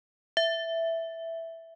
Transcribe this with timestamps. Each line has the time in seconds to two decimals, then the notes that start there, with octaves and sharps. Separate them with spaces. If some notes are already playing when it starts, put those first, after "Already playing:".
0.37 E5